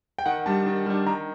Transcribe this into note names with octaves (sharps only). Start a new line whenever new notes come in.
G5
D#3 F#5
G3 D4 A5
D#3
G3 D4
D#3 A#5